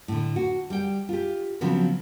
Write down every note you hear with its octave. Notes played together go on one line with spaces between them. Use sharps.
A2 D3
F#4
G3 G5
F4 G4
C#3 F3 F#3 B3 C4